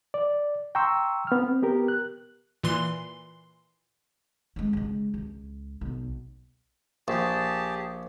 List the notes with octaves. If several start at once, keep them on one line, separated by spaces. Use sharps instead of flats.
D5
G5 A#5 C6 C#6 E6
B3 F6
C4
B3 G4 A#4
F#6
A#2 E3 C6
G#3 C#4
C#3 G#3
C#2
B1
A#1 G4 G#4 A5